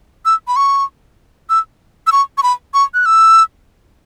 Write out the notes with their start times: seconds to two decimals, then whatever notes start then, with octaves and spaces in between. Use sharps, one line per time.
0.25 E6
0.48 B5
0.56 C#6
1.50 E6
2.07 E6
2.12 C#6
2.38 C#6
2.43 B5
2.74 C#6
2.94 F#6
3.06 E6